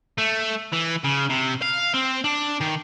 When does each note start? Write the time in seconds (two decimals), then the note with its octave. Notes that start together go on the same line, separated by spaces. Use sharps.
0.18 A3
0.72 E3
1.04 C#3
1.29 C3
1.62 F5
1.94 C4
2.24 D4
2.60 D#3